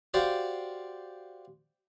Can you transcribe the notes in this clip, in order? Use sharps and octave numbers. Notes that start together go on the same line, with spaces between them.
F#4 G4 C5 D5 F5